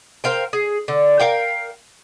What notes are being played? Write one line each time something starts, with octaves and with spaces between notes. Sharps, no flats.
A#4 C5 F5 G5
G#4
D3
A#4 F5 G5